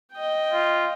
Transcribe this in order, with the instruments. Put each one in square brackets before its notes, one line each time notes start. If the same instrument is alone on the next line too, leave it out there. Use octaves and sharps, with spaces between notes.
[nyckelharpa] D#5 G5
[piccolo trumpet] F4